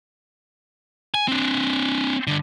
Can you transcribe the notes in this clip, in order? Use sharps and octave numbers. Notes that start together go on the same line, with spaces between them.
G#5
C4 D4
G2 D3